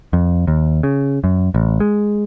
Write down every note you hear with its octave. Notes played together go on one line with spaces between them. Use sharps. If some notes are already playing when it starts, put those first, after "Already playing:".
F2
D#2
C#3
F#2
A1
G#3